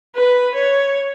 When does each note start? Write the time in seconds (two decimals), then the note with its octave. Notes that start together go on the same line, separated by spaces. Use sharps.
0.15 B4
0.55 C#5